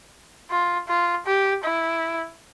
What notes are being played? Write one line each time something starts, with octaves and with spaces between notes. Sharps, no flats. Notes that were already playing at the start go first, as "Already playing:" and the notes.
F4
F4
G4
E4